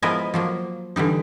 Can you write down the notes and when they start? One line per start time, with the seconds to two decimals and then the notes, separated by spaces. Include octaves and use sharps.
0.02 F3 G#3 B3 E4 A#4 D#5
0.34 F3 F#3 A#3
0.96 D3 E3 G3 D#4